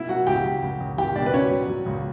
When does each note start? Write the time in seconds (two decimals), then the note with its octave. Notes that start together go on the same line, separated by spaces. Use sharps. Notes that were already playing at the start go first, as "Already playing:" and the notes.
Already playing: B2 E4 E5
0.09 F#3 F#4 F#5
0.27 C#2 G4 G5
0.45 F#3
0.62 C#2
0.81 C#2
0.98 C#2 G4 G5
1.15 B2 D4 D5
1.26 B4
1.34 F#3 C#4 C#5
1.51 F#3
1.69 F#3
1.86 C#2